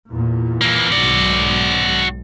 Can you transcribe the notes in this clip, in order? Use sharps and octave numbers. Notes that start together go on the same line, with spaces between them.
E2 A#2
E3 A#3
B1 G#2 F#4 D5